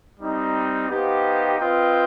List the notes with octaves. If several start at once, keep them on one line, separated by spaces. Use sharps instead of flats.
G3 C4 D#4
B3 D#4 G4 C5 F5
C4 F4 B4 D#5 G5